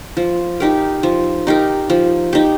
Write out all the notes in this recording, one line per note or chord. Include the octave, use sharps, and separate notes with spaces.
F3
D#4 G4 A#4
F3
D#4 G4 A#4
F3
D#4 G4